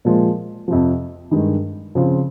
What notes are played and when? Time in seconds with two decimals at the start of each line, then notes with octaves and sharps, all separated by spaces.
0.05 A#2 F3 G#3
0.68 F2 C3 F3
1.31 G2 D#3 G#3 D#4
1.95 C#3 F3 C4 F4